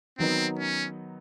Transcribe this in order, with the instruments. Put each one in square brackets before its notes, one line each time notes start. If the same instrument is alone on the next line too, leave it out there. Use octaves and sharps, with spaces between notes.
[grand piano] D#3 F#3 B3 D#4 [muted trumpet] C4
[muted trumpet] C#4